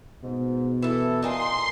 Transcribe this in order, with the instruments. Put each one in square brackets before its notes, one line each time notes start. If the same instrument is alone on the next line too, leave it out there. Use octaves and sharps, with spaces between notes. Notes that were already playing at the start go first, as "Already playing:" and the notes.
[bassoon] G#2 [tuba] B2
[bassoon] E3 [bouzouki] E4 A4
[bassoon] A#2 [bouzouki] D#4 A#4 G#5 [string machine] C6